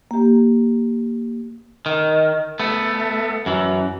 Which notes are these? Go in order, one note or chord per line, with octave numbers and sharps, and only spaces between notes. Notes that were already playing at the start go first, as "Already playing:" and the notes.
A#3 G4
D#3
A3 B3
F#2 E3